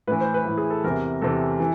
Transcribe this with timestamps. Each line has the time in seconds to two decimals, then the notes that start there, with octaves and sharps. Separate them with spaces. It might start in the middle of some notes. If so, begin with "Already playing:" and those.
0.07 A2 E3 B4
0.21 C5
0.34 B4
0.45 A2 E3
0.58 G#4
0.70 A4
0.84 E2 C3 E3 A#4
1.22 E2 C3 E3 A4
1.60 E3